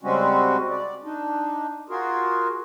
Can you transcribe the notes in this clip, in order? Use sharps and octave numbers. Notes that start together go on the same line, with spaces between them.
C#3 G3 G#3 C4 C#4 F#4
D5
D4 D#4
F4 F#4 G#4 A#4